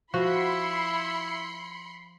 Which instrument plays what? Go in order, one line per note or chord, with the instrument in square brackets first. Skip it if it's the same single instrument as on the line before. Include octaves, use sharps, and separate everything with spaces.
[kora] F3 [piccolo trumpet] E4 [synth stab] F#4 [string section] B5 C6 C#7